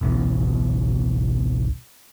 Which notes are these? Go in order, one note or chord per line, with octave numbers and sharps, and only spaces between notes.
G#1 C#2 B2 E3